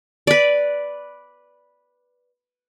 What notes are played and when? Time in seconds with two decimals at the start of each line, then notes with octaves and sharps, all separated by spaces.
0.27 B4 D5